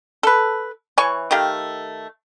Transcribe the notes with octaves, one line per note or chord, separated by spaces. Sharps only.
A4 B4
E3 C#5 G#5 C#6
D#3 A3 G4 F5